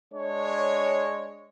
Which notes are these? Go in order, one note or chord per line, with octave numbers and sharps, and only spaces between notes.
G#3 D4 C#5